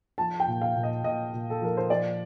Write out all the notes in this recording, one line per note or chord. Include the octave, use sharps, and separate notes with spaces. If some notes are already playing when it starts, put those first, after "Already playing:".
F3 A5
G5
A#2
F5
A#2
D#5
A#2 D#5
A#2
A4
F3 A#4
C5
F3 D5